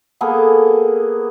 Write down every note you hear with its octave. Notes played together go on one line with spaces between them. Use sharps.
A#3 B3 G#4 A4